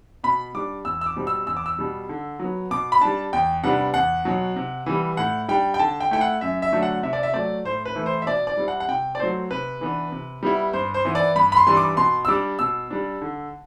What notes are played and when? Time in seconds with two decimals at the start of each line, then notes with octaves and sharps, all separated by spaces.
0.24 B2 B5
0.55 G3 D4 D6
0.85 E2 E6
1.01 E6
1.06 D6
1.16 B2 G3 C4
1.27 E6
1.47 E2 E6
1.57 D6
1.66 E6
1.79 B2 G3
2.09 D3
2.40 F#3 B3
2.71 B2 D6
2.92 B5
3.01 G3 D4 A5
3.33 E2 G5
3.64 C3 G3 B3 D4 F#5
3.94 E2 F#5
4.25 B2 F#3
4.56 C3
4.86 E3 G3 B3
5.17 A2 F#5
5.48 G3 D4 G5
5.74 G5
5.79 D3 A5
6.00 G5
6.11 A3 E4 G5
6.21 F#5
6.41 F#2 E5
6.62 E5
6.72 D3 F#3 A3 D4
6.82 F#5
7.03 C3 E5
7.13 D5
7.23 E5
7.34 F#3 A3 D5
7.65 A2 C5
7.85 B4
7.95 E3 A3 E4
8.06 C5
8.22 E5
8.27 B2 D5
8.47 D5
8.57 G3 C4 E4
8.68 F#5
8.80 F#5
8.88 C3 G5
9.15 D5
9.19 F#3 A3 C4 C5
9.50 C3 B4
9.81 E3 B3 D4
10.12 C3
10.43 G3 B3 E4
10.73 G2 C5
10.94 C5
11.05 E3 B3 E4
11.15 D5
11.36 G2 B5
11.52 B5
11.56 C6
11.67 E3 G3 D4 C6
11.77 D6
11.97 B2 C6
12.25 E6
12.28 G3 D4 D6
12.59 B2 E6
12.90 G3 D4
13.22 D3